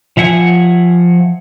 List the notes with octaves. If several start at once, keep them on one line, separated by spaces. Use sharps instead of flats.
F3 E5 F#5 G#5